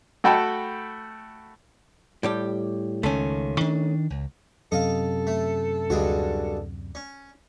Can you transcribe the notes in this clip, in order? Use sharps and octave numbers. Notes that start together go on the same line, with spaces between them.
A3 F#4 G5 A5 B5
A2 G3 G4
C#2 D#3 A3 C#4
D#3 D4
C#2
F#2 C3 A4 D#5 F5
A3
D2 G2 G#3 F#4
C#4